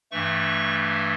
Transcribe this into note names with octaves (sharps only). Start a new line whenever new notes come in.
G2 E3 A3 C#6